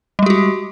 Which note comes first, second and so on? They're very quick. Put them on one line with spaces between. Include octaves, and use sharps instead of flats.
G3 G#3 G4 F#4